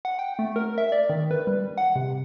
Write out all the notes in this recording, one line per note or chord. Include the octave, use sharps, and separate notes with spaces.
F#5
G5
A3
A#4
E5
D5
D#3
B4
G3
F#5
C3